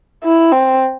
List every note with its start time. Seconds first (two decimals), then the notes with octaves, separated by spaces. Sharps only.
0.24 E4
0.52 C4